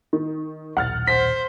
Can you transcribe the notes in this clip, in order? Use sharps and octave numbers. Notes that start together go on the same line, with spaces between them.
D#3
D#1 B1 F#5 F6 A6
C5 B6